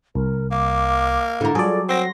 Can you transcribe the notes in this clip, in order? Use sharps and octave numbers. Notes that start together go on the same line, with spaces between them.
C2 A#4
A#3 D6
D3 E4 A#4
F#3 F4 G#4 A4 D5
C4 F#5 C6 A#6